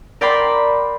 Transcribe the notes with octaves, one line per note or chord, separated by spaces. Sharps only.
A#4 D5 G5 B5 C6